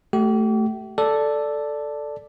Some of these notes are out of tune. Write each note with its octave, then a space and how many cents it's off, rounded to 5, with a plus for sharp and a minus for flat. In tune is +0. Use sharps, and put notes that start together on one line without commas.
A3 +0 G4 -40
A4 +0 D5 +0